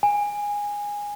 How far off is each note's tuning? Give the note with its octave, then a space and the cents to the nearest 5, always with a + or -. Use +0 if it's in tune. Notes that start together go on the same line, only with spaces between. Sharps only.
G#5 -15